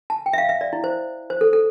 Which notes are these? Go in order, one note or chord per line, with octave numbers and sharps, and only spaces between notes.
A5
G5
E5
F5
E5
D5
E4
C5
C5
A4
A4